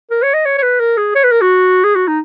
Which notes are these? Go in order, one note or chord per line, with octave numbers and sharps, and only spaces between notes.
A#4
C#5
D#5
C#5
C#5
B4
A#4
G#4
C#5
B4
A#4
F#4
G#4
F#4
D#4